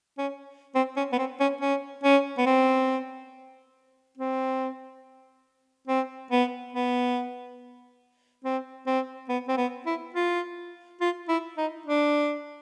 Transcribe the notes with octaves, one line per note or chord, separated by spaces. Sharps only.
C#4
C4
C#4
B3
C4
C#4
C#4
C#4
B3
C4
C4
C4
B3
B3
C4
C4
B3
C4
B3
E4
F4
F4
E4
D#4
D4